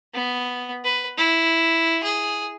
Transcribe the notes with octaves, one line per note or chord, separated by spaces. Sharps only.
B3
B4
E4
G#4